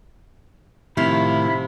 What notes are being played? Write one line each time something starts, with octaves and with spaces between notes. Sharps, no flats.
A2 C3 D#3 F3 E4 F5 B5